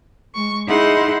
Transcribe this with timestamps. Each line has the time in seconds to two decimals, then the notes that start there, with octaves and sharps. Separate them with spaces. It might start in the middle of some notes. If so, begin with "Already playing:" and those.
0.33 G#3 C#6
0.68 D#4 E4 G#4 F#5 C6